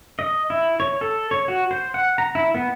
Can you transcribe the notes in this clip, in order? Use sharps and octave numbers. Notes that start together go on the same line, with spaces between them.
D#5
E4
C#5
A4
C#5
F#4
C5
F#5
A#5
E4
B3